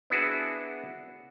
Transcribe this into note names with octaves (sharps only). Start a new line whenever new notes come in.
B3 D4 E4 F#4 G#4 A5